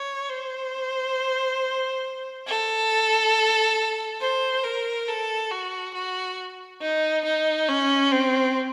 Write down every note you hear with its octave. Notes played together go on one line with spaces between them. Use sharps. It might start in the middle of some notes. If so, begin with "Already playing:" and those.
Already playing: C#5
C5
A4
C5
A#4
A4
F#4
F#4
D#4
D#4
C#4
C4